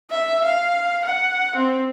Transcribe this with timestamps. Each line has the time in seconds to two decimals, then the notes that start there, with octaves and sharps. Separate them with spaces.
0.10 E5
0.45 F5
1.05 F#5
1.56 C4